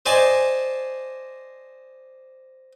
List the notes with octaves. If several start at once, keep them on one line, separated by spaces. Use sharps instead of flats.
C5 D5 D#5 G#5 A5